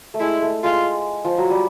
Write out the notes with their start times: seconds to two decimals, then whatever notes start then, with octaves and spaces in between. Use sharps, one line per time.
0.14 A3
0.20 G#3 E4
0.42 A3
0.64 G#3 F4
1.25 F3
1.38 F#3
1.50 G3